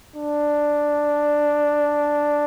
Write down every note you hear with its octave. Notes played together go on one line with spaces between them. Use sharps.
D4